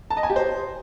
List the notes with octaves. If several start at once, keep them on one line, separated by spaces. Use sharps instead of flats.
A5
D#5
G#5
G4
C5